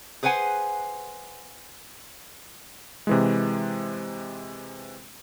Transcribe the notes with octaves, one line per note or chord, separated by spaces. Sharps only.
G#4 B4 C5 F#5 G#5
C3 E3 G#3